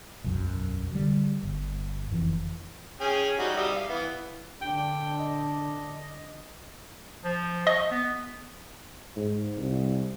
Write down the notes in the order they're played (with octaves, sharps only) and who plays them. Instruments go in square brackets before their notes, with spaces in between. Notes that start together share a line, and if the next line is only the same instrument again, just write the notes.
[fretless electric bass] E1 B1 F#2
D3 G3
G1
F#1 F2 E3
[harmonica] C#4 G#4 G5
G3 D#4 F#4
G3 E5 D#6
F5
E3 B3
[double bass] D3 D4 [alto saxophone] G5
[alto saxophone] D#5
[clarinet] F3
[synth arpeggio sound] D#5 [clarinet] C#6
[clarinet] B3
[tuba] G#2
C2